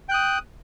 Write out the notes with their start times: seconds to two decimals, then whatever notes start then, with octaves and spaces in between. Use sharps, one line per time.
0.09 G5
0.11 F#6
0.14 D#6